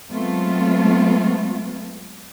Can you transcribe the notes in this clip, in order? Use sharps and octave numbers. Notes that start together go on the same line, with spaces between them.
F#3 G#3 A3 B3 C4 F4